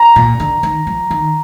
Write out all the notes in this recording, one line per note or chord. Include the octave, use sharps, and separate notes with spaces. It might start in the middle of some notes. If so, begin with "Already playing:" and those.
Already playing: A#5
A#2
D3
D#3
F3
D#3